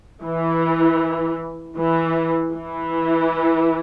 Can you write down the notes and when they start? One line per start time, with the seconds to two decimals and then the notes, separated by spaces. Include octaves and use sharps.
0.23 E3
1.77 E3
2.53 E3